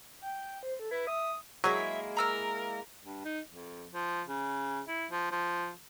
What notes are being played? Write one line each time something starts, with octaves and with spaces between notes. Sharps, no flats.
G5
C5
A4
E4 B4
E5 D#6
F#3 G#3 A#3 E4 G#4 E5
A#4 A#5 E6 F6
G2
D#4
F2
F3
C#3
E4
F3
F3